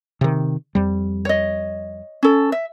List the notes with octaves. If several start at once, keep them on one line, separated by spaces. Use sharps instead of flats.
C3 D#3
F2 G3
C#5 D#5
C#4 A4
E5